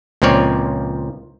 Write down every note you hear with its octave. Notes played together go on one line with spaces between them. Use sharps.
C#2 A#2 F3 C4 C#5 D5